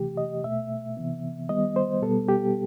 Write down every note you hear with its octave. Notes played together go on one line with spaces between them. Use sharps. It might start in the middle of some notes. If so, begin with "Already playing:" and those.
Already playing: C3 E3 A3 G4
D#5
B2 A3 E5
C3 E3 B3
D#3 G3 B3 D#5
C5
B2 G3 B3 A4
G4